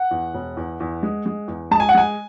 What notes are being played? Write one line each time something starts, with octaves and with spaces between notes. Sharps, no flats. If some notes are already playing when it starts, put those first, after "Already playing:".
Already playing: F#5
E2
E1
E2
E2
G#3
G#3
E2
G#3 A5
G#5
F#5
G#3 G#5